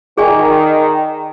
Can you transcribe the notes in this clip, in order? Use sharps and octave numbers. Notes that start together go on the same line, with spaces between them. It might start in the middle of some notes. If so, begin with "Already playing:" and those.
D#3 G#4 D5 G#5